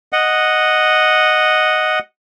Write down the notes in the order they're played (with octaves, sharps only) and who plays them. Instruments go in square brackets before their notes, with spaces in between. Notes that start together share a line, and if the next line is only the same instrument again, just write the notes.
[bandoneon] D#5 F#5